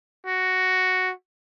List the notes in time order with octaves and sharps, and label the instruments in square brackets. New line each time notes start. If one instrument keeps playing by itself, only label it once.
[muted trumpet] F#4